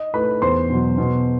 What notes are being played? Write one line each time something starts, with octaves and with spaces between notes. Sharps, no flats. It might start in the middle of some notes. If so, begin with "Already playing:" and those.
Already playing: D#5
A3 E4 B4 B5
E2 C5 C6
B2 F#3
B2